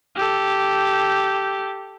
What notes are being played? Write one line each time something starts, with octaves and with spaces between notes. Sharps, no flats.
G4 A4